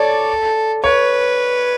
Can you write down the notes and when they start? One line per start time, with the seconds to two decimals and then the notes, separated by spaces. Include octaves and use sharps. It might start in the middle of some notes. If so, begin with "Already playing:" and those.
Already playing: A4 C#5 D5
0.84 B4 C#5